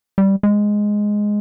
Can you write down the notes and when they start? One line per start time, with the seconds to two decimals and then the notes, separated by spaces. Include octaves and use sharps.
0.18 G3
0.43 G#3